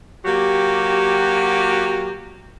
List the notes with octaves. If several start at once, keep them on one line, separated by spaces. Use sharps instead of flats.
F#3 A#3 F#4 G4